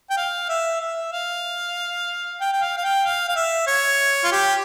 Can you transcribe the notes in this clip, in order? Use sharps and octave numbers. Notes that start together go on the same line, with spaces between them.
G5
F5
E5
E5
F5
G5
G5
F5
F5
G5
F5
F5
E5
C#5
F4
G4